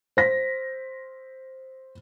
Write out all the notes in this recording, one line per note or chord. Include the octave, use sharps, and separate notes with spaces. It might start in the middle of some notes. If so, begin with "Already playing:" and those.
C5 A#6 B6